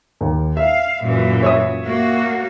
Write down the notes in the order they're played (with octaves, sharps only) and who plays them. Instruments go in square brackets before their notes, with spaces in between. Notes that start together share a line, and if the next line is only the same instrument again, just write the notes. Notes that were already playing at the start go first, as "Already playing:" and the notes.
[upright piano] D#2
[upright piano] E5 [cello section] F5
[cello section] F#2 A#2 E3
[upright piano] C#5 E5 D#6
[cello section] A#3 F#4